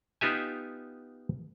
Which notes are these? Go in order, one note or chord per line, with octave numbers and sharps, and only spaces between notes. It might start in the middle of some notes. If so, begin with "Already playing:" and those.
B3 D#4 F4 G4 E5 G#5